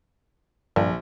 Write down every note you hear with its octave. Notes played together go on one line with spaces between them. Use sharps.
A#1 G2